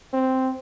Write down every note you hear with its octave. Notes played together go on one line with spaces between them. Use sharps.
C4